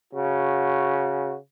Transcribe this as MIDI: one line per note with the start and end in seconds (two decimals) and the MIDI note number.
0.14 1.35 49
0.14 1.35 66